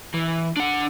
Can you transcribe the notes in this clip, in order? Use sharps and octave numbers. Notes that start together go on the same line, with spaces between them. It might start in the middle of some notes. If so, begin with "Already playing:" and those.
E3
D4 F#5